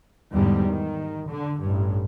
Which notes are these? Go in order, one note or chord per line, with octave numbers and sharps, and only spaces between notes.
E2 G#2 D3 G3
D#3
D3
A1 G2